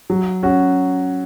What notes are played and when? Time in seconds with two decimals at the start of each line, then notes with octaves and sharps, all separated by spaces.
0.10 F#3
0.43 C#4 F#4